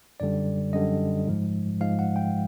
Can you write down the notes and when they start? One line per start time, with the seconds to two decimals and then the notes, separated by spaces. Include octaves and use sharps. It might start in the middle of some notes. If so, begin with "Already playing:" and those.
0.20 F#2 D3 G3 D5
0.73 F#2 D3 G3 D#5
1.27 G#2 F3 G#3
1.80 G#2 F3 G#3 F5
1.99 F#5
2.16 G5